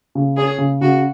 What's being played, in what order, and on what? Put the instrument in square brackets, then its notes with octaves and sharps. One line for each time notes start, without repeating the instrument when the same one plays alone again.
[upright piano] C#3
[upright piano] C#4 [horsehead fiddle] G#4
[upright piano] C#3
[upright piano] C#3 [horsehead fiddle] F#4